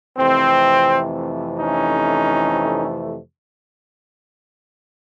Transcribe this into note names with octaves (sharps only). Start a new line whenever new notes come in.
F2 C3 E3 A3 C4
C#4 D#4